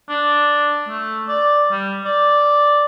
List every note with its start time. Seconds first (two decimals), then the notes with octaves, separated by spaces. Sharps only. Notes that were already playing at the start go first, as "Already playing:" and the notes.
0.09 D4
0.88 A3
1.28 D5
1.72 G3
2.05 D5